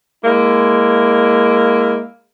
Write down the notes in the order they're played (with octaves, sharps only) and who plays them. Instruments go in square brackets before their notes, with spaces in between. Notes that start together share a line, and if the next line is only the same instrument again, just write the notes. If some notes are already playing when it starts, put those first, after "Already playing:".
[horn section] G#3 A#3 E4